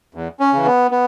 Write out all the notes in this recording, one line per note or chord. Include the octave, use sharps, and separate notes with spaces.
E2
C#4
C#3 E3
B3
B3